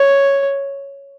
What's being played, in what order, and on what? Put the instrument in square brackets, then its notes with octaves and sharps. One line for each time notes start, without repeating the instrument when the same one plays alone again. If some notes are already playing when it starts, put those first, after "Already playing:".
Already playing: [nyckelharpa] C#5